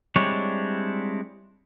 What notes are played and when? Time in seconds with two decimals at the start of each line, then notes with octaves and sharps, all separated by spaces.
0.16 G3 G#3 C4 D4 E4 C#5